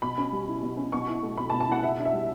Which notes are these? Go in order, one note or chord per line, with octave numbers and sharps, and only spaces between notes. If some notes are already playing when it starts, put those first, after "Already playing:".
B2 B5
C#4
G3
E4
B2
C#4
B2 C#6
E4
A3
B2 B5
A5
B2
A5
E4 F#5
C#3 E5
D4
E5
G3